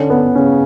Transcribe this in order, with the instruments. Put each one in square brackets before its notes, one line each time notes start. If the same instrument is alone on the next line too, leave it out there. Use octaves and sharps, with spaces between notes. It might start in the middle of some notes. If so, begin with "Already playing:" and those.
Already playing: [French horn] D3 [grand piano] C#4
[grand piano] B3
[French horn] C#3 [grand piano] C#4